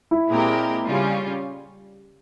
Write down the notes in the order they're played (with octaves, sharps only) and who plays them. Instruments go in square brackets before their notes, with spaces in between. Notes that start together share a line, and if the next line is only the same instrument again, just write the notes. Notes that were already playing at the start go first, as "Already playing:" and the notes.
[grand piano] E4
[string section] A#2 G#3 C4 G4 A#4
C#3 G3 C#4 F4